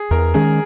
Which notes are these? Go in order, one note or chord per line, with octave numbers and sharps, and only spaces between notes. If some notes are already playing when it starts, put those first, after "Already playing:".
Already playing: G#4
E2 A#4
D#3 G#3 C#4 G#4